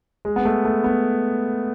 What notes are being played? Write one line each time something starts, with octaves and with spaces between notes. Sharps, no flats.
G#3
B3
A3
A3
B3